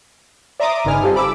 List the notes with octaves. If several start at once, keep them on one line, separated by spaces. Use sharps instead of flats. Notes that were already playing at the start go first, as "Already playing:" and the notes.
D5 E5 A#5 C6 D6 D#6
G1 C#3 D#4 B4 G#5 F6
G3 C4 F4 G4 A4
B5 D6 E6